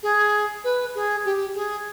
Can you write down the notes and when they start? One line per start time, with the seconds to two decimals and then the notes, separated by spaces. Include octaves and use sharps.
0.03 G#4
0.64 B4
0.95 G#4
1.25 G4
1.55 G#4